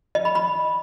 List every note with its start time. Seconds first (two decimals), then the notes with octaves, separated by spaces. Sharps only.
0.15 D#5
0.25 B5
0.35 B5